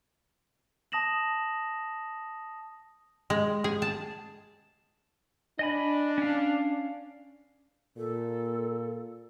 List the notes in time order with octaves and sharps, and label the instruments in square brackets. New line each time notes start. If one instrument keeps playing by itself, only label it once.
[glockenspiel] A5 D#6 A#6 E7 F#7
[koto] G#3
G#4
A5
[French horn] D4 [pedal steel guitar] D#5 G#5 B5
[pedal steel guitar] C#4 F5
[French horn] A#2 [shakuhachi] A4